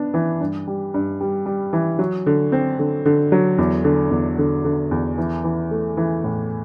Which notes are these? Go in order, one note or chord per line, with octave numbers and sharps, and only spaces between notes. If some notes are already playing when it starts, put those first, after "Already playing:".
Already playing: B3 D4
E3
G2
G3
G2
G3
G3
E3
F#3
D3
C4
D3
D3
F#3
E2
D3
E2
D3
D3
E2
E3
E3
A3
E3
A2